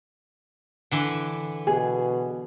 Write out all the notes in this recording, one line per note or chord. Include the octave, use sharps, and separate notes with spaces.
D3 E3 B4
B2 G#4